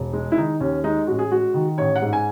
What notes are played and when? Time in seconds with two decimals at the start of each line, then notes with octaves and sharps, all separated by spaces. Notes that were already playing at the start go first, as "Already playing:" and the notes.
Already playing: E1
0.13 G#3
0.32 E4
0.37 D#3 D#4
0.60 D#2 C#4
0.84 G#3 D#4
1.07 A1 F#4
1.19 G#4
1.31 G#3 F#4
1.54 D#3
1.78 A1 C#5
1.96 F#5
2.02 G#2
2.13 G#5